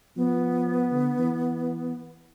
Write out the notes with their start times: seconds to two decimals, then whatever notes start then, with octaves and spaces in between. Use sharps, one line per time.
0.16 F3 B3
0.90 D3
1.19 E3